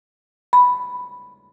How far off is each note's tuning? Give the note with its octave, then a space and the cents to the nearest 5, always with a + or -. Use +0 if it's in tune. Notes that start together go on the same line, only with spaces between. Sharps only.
B5 +0